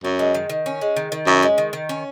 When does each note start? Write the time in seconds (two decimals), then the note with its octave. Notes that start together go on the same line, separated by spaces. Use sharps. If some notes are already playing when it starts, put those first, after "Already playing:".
0.04 F#2 C#4
0.19 G#3
0.34 D#3
0.50 D#3
0.66 C#4
0.81 G#3
0.96 D#3
1.12 D#3
1.27 F#2 C#4
1.43 G#3
1.58 D#3
1.73 D#3
1.89 C#4